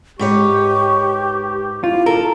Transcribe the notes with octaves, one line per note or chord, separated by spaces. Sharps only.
G#2 G4 B4 C#5 C#6
E4 F4
E4 A4 A#4